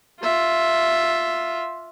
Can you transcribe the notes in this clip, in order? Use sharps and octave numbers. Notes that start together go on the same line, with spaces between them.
F4 E5